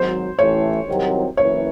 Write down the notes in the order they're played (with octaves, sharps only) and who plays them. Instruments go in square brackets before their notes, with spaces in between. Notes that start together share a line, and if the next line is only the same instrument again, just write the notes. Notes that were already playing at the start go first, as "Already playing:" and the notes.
Already playing: [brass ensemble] G#1 G#2 F#3 [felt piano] C5
[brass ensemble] A1 A2 E3 A3 [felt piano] C#5
[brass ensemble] C2 C3 D#3 F#3
[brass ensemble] F#1 F#2 E3 [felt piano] C#5